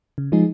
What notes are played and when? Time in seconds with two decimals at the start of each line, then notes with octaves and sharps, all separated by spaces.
0.18 C#3
0.32 F3 G#3 D#4 G#4